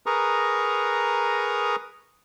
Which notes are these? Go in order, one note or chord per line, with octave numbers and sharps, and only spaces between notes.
G#4 A#4 B4 A#5 C#6 D#6